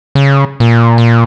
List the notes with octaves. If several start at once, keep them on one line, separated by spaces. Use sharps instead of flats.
C#3
A#2
A#2